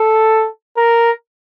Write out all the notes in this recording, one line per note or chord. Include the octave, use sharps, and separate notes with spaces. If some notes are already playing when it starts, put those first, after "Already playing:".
Already playing: A4
A#4